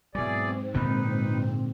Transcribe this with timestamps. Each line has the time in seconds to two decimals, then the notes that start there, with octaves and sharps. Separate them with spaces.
0.15 G#2 B2 E3 F#3 C4 G#4 D5
0.74 A#2 D3 F3 D#4 B4